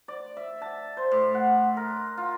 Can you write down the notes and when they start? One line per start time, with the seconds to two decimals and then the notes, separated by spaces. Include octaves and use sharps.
0.08 D5
0.37 E5
0.62 A5
0.97 C5
1.12 A2
1.35 F#5
1.77 A#4
2.17 F4